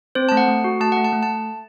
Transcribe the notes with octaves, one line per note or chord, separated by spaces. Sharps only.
C4 C5
A3 A5
F#5
A3
F#4
A3 A5
A3 F#5
A5
A3
A5